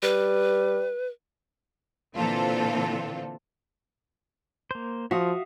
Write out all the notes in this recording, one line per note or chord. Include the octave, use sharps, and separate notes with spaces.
G3 B4
A#2 D3 E3 C4 F4 A4
A#3 C5
F3 F#4 E5 F5 D#6